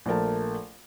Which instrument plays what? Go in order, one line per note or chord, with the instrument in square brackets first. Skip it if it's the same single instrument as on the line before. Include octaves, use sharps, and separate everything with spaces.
[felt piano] A#1 A3 A#4 A5